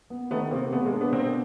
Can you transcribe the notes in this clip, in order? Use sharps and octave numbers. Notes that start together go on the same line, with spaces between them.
B3
D#3 A3 B3
C3 A#3 C4
B2 A3 B3
G#3 A#3
D4
B3
B2 A#3 C4